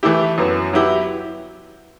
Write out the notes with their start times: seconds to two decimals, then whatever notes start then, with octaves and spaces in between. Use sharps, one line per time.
0.03 E3 A3 E4 G4
0.38 F#2 F#3 B3
0.73 F#3 B3 E4 G4